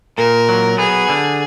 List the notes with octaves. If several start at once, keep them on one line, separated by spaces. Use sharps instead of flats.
A#2 A#4
F#3
B3 G#4
D3